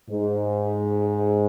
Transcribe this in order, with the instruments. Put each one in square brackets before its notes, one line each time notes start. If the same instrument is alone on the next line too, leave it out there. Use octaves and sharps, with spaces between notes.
[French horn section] G#2